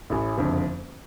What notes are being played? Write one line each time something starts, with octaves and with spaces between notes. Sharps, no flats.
A1 A2
F#1 F2 D3